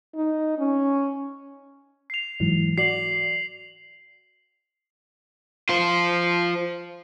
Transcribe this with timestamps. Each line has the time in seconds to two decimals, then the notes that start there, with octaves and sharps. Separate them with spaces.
0.15 D#4
0.59 C#4
2.10 C7 F7
2.40 G#2 E3 F#3
2.78 F#4 D5 C7 F#7
5.69 F4 C5